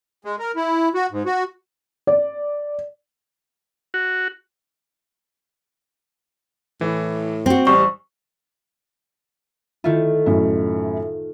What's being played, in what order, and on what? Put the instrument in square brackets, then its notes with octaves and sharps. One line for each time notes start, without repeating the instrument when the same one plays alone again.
[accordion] G#3
A#4
E4
F#4
G#2
F#4
[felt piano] D5
[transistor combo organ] F#4
[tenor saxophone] A2 [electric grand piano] E3
[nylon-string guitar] C4 F#4
[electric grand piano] A1 C5 [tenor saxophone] G3 [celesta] C#6
[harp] D#3 A3 F4 [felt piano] E4
[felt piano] F#2 A2 E4